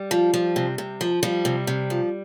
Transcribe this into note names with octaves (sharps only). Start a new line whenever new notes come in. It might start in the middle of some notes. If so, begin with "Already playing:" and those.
Already playing: G3
F3
F3
C3
C3
F3
F3 G3
C3
C3
F3